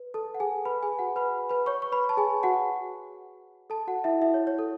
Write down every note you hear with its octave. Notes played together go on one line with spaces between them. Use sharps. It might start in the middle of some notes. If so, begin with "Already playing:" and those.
Already playing: B4
A4 A5
F#5
G#4 G#5
B4 B5
G#4 G#5
F#4 F#5
B4 B5
B4 B5
C#5 C#6
C#6
B4 B5
A5
G#4 G#5
F#4 F#5
A4 A5
F#4 F#5
E4 E5
E4 E5
C#5
C#5
A4